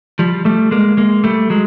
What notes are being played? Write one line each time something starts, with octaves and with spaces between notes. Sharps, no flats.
F3 G3
G3 A3
G#3 A#3
G#3 A#3
G3 A3
F#3 G#3